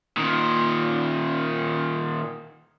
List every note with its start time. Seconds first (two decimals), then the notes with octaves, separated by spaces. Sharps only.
0.17 A#2 D#3